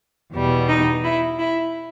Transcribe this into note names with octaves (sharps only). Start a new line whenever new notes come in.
E2 B2 G3
D#4
E4
E4